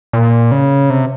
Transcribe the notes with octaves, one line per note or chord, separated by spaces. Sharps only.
A#2
C#3
C3